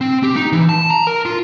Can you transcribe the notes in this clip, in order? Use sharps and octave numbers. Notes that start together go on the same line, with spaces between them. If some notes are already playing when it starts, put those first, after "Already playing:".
C4
G4
D#4
E3
A5
A#5
A#4
F4